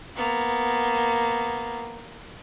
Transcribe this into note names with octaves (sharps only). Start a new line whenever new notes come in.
A#3 B3